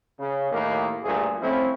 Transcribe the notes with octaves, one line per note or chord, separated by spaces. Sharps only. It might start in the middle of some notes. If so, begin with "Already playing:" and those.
C#3
D#2 A2 D#3 A#3
D2 G2 A#2 A3 G#4
F3 A3 C4 C#4 E4